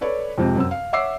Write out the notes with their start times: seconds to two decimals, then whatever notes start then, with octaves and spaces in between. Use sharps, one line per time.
0.01 A4 B4 C#5 D5
0.38 F2 G#2 C3
0.56 F#2 C4 E6
0.71 F5
0.93 C#5 E5 F#5 D6 E6 C7